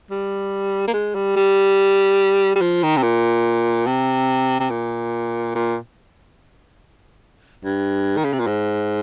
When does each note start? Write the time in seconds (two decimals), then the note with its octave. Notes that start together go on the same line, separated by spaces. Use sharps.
0.10 G3
0.88 A#3
0.93 G#3
1.15 G3
1.36 G3
2.55 G3
2.61 F3
2.83 D#3
2.96 C3
3.03 A#2
3.86 C3
4.60 C3
4.70 A#2
5.55 A#2
7.64 G2
8.17 D#3
8.24 C#3
8.33 C3
8.39 A#2
8.47 G#2